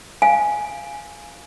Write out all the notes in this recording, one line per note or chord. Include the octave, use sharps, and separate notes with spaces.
F5 G#5